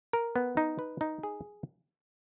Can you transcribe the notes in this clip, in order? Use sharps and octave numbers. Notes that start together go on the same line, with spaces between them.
A#4
B3
D#4
B4
D#4
G#4